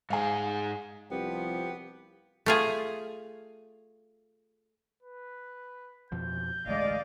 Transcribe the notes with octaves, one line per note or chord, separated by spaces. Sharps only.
G#2 G#3 F5 G#5
C2 F3 B3 G4
A3 F4 G#4
B4
F2 B2 F3 G6
A1 D2 G#3 D5 D#5 F5